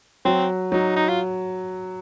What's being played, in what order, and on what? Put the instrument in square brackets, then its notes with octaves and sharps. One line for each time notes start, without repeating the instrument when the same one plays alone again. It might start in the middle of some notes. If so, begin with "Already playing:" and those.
[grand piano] F#3 [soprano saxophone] C4
[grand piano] F#3 [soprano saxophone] D#4
[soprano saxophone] D#4
F4